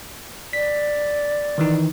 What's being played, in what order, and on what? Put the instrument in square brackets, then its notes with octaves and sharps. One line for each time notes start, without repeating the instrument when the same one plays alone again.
[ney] D5 [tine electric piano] B6
[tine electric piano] D#3 E3 D#4